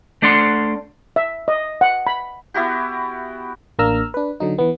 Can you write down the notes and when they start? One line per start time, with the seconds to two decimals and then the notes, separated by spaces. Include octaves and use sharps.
0.22 A3 D4 D5 F#5 C6
1.16 E5
1.48 D#5
1.81 F#5
2.07 B5
2.54 B3 E4 F#4 G4
3.79 A1 A#3 D4 A#5 E6 F6
4.14 D4 B4
4.40 D3 F#3 D#4
4.58 E3 B3